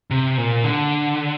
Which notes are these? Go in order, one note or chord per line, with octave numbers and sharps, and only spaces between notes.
C3
A#2
D3